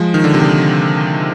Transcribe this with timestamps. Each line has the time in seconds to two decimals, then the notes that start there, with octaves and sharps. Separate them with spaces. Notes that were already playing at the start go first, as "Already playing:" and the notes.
Already playing: F3 G#3
0.14 D#3
0.24 D3
0.34 C3
0.44 D3